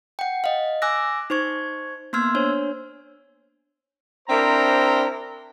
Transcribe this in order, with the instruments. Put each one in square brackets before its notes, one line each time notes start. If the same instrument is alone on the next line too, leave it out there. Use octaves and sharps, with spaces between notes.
[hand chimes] F#5 G5
D#5 F5
G#5 D6 E6 F#6 A#6
D#4 C5 C#6 G#6
A#3 B3 C6 E6 F6 G#6
D4 C5 C#5
[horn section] C4 D4 E4 A#4 C5 A#5